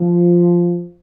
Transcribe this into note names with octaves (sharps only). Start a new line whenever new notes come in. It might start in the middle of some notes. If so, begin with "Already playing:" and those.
Already playing: F3